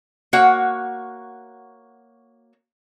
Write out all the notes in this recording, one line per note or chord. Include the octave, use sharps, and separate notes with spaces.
A#3 F#4 C#5 F#5